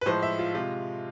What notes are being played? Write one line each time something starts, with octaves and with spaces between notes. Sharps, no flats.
B4
A2 F3 G#3 C5
E5
F4
C3 G#3 F4